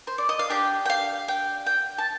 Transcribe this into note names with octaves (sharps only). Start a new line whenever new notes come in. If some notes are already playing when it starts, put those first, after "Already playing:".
C5
D5
D#5
F5
D4 G4 G5
G5
F5
G5
G5
A5